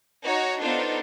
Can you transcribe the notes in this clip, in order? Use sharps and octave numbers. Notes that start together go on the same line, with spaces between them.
D#4 F#4 C#5 A#5 C#6
B3 D4 D#4 F4 A4 C5